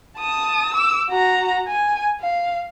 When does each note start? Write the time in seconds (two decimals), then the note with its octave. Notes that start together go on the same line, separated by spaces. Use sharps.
0.17 A5 D#6
0.74 D6 E6
1.10 F#4 A#5
1.68 G#5
2.21 F5